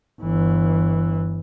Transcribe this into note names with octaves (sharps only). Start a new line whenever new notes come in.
G1 E3